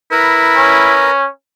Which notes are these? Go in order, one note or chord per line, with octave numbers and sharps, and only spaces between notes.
E4 A#4 B4
C#4